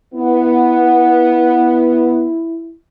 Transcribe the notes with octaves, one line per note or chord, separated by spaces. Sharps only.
B3 E4